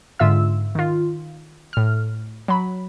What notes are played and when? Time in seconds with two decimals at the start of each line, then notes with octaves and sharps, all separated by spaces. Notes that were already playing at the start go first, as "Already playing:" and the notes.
0.19 G#2 D3 F4 E5 E6
0.75 D#3 F4
1.73 A2 F6
2.48 F#3 B5